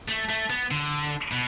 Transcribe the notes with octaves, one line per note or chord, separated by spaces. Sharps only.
A3
A3
B3
D3
B2